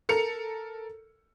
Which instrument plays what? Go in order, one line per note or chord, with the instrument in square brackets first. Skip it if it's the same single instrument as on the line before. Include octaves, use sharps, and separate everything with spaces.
[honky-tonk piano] A4 A#4 C#7 F7